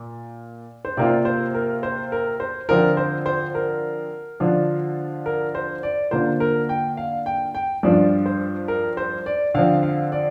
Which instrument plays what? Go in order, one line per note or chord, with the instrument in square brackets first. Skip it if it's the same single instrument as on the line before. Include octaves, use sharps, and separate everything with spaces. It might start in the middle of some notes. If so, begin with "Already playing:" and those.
Already playing: [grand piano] A#2
[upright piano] C5
[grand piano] C3 A#3 F4 [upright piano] D5
[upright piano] C5
A#4
C5
A#4
C5
[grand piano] D3 F3 C4 F4 [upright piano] A#4
[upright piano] C5
C5
A#4
[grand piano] D3 F3 D4 F4
[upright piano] A#4
C5
D5
[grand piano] D3 A#3 F4 [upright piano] C5
[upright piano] A#4
G5
F5
G5
G5
[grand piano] G2 F3 D4 F4 [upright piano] D5
[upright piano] C5
A#4
C5
D5
[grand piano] D3 F3 C4 [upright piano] F5
[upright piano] F5
D5